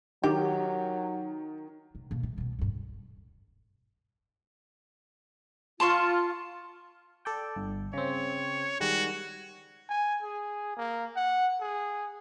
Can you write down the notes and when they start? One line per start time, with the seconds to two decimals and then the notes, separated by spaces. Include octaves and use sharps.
0.24 D#3 F#3 G4
1.95 C3
2.11 B2 A#3
2.23 C3
2.38 C2 B2
2.59 G2 B2
5.80 F4 A5 C6 C#6
7.25 A4 D5 G5
7.56 G1
7.93 C#3 C4 C#5
8.80 D#3 G3 G#3 F#4
9.89 G#5
10.23 G#4
10.77 A#3
11.16 F#5
11.61 G#4